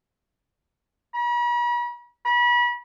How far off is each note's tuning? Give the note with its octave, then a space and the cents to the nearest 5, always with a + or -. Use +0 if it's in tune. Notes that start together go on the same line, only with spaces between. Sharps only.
B5 -45
B5 -35